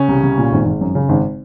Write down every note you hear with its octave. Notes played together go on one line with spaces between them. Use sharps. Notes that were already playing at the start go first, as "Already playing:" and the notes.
Already playing: C#3 C#4
C2
C2
A#2
G#1
G#1
F#2
C#3
G#1